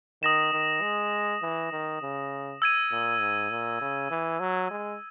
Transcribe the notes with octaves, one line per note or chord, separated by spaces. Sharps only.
D#3 D#6 A#6 E7
D#3
G#3
E3
D#3
C#3
E6 G#6 D#7
A#2
G#2
A#2
C#3
E3
F#3
G#3